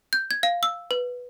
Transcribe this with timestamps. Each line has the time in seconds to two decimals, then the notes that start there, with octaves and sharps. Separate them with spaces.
0.13 G6
0.31 G#6
0.43 F5
0.63 E6
0.91 B4